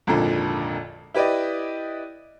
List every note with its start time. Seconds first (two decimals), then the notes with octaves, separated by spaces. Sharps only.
0.07 G#1 F2 A#2 D3 A4 A#5
1.15 E4 G4 B4 D5 D#5